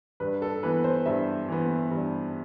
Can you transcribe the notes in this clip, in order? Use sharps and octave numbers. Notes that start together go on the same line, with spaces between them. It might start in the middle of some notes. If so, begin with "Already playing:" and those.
G2 B4
A4
E3 B3 B4
C5
G2 E5
E3 B3
G2